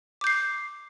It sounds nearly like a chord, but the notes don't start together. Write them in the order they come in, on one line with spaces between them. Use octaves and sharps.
D6 G6 C7